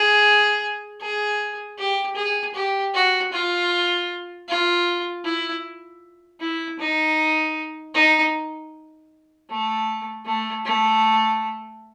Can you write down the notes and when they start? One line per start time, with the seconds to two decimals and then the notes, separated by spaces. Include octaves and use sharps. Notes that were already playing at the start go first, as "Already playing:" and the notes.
Already playing: G#4
1.01 G#4
1.78 G4
2.16 G#4
2.54 G4
2.94 F#4
3.33 F4
4.48 F4
5.25 E4
6.41 E4
6.79 D#4
7.94 D#4
9.49 A3
10.26 A3
10.65 A3